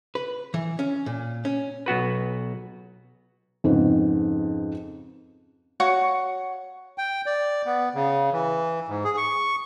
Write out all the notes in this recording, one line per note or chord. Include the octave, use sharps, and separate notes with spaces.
B4
E3
C#4
A#2
C#4
B1 B3 F#4 B4
F2 G#2 C#3 B3
F#4 C#5 F#5 C#6
G5
D5
B3
C#3
E3
G#2
G#4
C#6